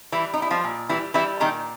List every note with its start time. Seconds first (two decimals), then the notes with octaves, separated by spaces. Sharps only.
0.12 E3 G3 E4
0.33 D#4
0.38 G3 E4
0.50 F3 F4
0.64 A#2
0.89 E3 G3 E4
1.14 E3 G3 E4
1.40 A#2 D#3 D#4